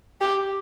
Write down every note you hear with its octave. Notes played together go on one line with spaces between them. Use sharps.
G4